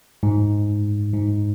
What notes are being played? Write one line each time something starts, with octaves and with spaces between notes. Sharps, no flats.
G#2
G#2